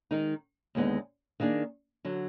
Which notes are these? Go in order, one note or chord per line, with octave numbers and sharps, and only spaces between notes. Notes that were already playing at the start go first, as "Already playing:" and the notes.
D#3 G#3 D#4
D#2 D3 G#3 B3 D#4
D#3 A#3 D4 G#4
D3 F#3